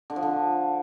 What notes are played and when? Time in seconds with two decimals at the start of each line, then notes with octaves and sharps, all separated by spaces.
0.10 D3
0.16 F3
0.23 D3